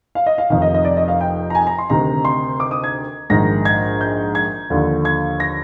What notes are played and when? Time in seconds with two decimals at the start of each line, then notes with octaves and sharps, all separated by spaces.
0.15 F5
0.26 D#5
0.38 F5
0.50 F1 F2 D#3 F5
0.62 D#5
0.74 D#5
0.85 D5
0.97 D#5
1.08 F5
1.21 G5
1.50 A#5
1.55 G#5
1.67 A#5
1.78 C6
1.90 D2 C3 D#3 A#5
2.25 C6
2.60 D6
2.71 D#6
2.84 G#6
3.30 A#1 G#2 D#3 A#6
3.65 G#6
4.01 G6
4.35 G#6
4.70 D#2 D3 F3
5.05 G#6
5.40 A#6